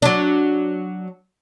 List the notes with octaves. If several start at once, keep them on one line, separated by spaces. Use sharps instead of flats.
F#3 D4